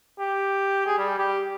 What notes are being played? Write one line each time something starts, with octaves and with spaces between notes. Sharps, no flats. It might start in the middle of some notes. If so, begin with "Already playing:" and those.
G4
G#4
G3
G4